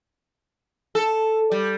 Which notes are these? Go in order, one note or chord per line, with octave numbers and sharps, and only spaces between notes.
A4
G3